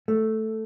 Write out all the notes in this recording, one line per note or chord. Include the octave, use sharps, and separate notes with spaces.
A3